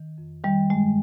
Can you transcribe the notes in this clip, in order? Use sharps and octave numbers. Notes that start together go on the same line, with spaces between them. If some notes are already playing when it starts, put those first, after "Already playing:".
Already playing: D#3
F2
D#3 G3
G2 G#3